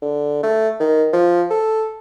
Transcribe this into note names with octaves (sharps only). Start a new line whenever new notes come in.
D3
A3
D#3
F3
A4